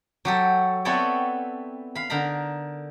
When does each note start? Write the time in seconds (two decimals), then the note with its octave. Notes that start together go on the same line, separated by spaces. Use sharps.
0.25 F#3 G4 A4
0.85 B3 C4 E4 A4 C#5 D5
1.95 F5 B5
2.10 D3 D#4 A#4 A#5 B5